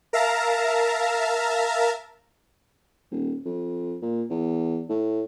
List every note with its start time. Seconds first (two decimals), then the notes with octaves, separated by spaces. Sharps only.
0.13 A#4 E5 F5 A5 A#5
3.11 D#1
3.45 F2
4.02 A#2
4.30 E2
4.89 A2